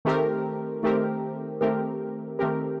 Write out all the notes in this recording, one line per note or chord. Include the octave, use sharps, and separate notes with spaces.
D#3 A3 C4 G4 A#4
D#3 A3 C4 G4 A#4
D#3 A3 C4 G4 A#4
D#3 A3 C4 G4 A#4